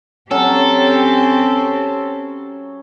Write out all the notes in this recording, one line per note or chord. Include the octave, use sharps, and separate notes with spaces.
F#3 C4 C#4 G4 A4